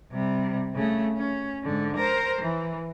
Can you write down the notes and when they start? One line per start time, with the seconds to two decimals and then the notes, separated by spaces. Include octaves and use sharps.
0.12 C3 G3
0.74 C#3 A3
1.17 C#4
1.63 G#2 D3
1.97 A#4 C5
2.41 E3